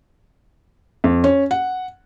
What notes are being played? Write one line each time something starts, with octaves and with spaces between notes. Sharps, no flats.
F2
C#4
F#5